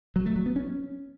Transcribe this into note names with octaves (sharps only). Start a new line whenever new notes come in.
F#3
A3
F#3
B3
C#4